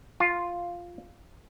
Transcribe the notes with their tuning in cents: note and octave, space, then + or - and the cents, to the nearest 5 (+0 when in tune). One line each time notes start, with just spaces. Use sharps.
F4 +0 F5 +0